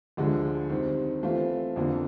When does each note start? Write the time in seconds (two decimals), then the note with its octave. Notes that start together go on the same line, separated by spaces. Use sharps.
0.17 D2 D3 F3 G#3
0.70 D#3 G3 C4
1.23 E3 A3 C4 F4
1.76 F2 D3 F3 A#3